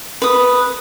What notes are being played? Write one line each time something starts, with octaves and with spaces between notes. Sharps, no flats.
B4 D#6